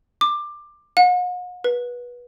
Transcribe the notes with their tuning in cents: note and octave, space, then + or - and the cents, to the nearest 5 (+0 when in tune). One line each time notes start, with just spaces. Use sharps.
D6 +15
F#5 -45
B4 -20